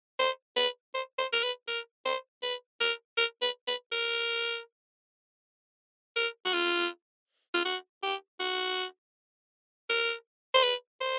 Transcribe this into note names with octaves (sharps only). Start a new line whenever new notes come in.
C5
B4
C5
C5
A#4
B4
A#4
C5
B4
A#4
A#4
B4
B4
A#4
A#4
F#4
F4
F4
F#4
G4
F#4
A#4
C5
B4
C5